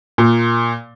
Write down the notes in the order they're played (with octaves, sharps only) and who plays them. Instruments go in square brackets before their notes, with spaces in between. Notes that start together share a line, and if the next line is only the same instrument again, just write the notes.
[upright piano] A#2